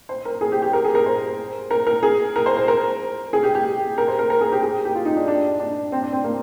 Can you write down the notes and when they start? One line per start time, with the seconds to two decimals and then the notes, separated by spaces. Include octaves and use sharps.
0.09 C5
0.25 A#4
0.41 G#4
0.52 G4
0.62 G4
0.73 A#4
0.84 G#4
0.95 A#4
1.06 C5
1.71 A#4
1.87 A#4
2.03 G#4
2.36 A#4
2.46 C5
2.57 C5
2.68 A#4
3.33 G#4
3.43 G4
3.55 G4
3.98 A#4
4.08 C5
4.19 A#4
4.30 A#4
4.41 G#4
4.52 G4
4.62 G#4
4.85 G4
4.95 F4
5.05 D#4
5.17 D4
5.28 D4
5.60 D4
5.92 C4
6.03 D4
6.13 C4
6.24 A#3